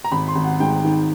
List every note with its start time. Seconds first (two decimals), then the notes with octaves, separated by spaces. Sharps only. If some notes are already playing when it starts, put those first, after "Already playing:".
0.04 A#5
0.12 G#1 B5
0.28 C6
0.35 G#1
0.44 F#5
0.60 G#2 G5
0.84 D#3